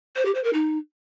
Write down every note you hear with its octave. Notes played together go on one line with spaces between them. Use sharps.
C5
G4
C5
A#4
D#4